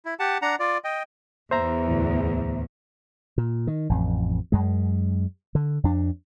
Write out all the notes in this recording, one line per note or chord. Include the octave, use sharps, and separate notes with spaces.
E4
G4 F#5 A5
D4 F#5 A#5
F4 D5
D#5 G5
E2 C5 E5 A#5
D2 A2 E3
A#2
D#3
A1 F2
F#2 G#3
D3
F2 D4